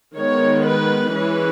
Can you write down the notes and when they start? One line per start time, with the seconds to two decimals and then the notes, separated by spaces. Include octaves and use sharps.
0.17 D#3 G#3 B3 C#5
0.66 B4
1.14 E3 G#3 C#4 B4